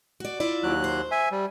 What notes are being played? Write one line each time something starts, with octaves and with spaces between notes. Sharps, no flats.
F#4 D5
E4 F4 D5
D#2 F#3 F#6
C5
E5 G#5
G3